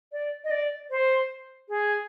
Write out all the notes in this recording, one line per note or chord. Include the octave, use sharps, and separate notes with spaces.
D5
D#5
D5
C5
G#4